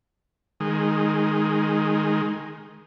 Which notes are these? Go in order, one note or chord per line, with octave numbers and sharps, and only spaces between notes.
D#3 G#3